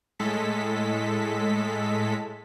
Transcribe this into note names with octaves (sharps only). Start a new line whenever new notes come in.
A2 G#3 A4 B6